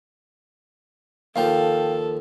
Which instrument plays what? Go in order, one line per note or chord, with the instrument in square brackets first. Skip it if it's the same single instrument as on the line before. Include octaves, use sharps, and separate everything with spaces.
[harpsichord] D#2 F3 [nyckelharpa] A4 [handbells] F5 G5